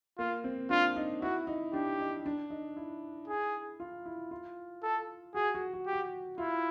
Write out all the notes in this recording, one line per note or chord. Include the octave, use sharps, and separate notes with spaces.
A#3 F4
C4
D4 F4
D#4
E4 F#4
D#4
D4 G4
D#4
D4
D#4
E4
G#4
F4
E4
F4
A4
F#4 G#4
F#4
F#4
G4
F#4
E4 F4